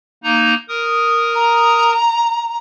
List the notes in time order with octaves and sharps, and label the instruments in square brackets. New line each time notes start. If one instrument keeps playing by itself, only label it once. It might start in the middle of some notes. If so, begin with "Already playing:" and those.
[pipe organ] A#3 D#4 A#5
A#4 D#6
[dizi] A#5